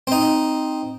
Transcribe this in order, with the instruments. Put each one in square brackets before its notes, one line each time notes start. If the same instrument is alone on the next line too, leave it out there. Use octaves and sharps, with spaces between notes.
[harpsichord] C4 D#4